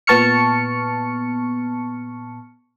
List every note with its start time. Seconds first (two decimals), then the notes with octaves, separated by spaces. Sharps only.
0.07 A#2 B3 A5 C#6 F6 C#7